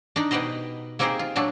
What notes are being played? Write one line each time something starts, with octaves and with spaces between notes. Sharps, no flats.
D4 D#4
B2 D#4 G4 B4 C5 D#5
A#3 C4 D#4 G4 G#4 C5
F4
A#2 F#3 D4 A4